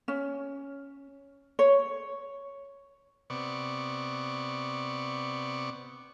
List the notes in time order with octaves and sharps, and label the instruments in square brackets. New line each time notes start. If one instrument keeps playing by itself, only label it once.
[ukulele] C#4
C#5
[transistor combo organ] C3 B3 D5 C#6